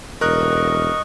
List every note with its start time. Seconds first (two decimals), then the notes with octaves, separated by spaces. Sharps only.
0.21 E1 A#4 D#5 C#6 F#6